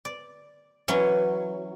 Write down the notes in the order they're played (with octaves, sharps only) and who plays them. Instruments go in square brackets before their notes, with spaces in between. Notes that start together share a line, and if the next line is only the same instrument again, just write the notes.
[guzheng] D5
E3 F#3 C#4